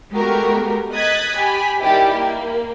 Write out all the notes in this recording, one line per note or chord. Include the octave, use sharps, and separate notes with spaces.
G#3 A3 B3 F#4 G4 A#4
D#5 D#6 F#6 G#6 A6 B6
G4 G#5 B5
D#3 G3 E4 G4
A#3